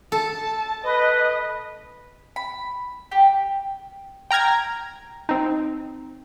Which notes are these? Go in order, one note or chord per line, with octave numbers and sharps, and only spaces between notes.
A4 A5
B4 D#5
B5
G4
G5 A#5 F6 G#6 A#6
C4 D#4